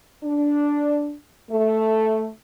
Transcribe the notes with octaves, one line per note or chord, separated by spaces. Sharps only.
D4
A3